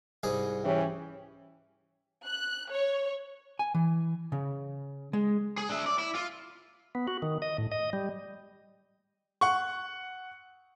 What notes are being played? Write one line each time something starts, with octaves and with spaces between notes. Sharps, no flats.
C2 G#2 G#4
E3 C#4 G4
F#6
C#5
G#5
E3
C#3
G#3
G#4
D4 E5
D5
E4
F4
B3
F#4
D#3
D#5
A2
D#5
G3
F#5 C#6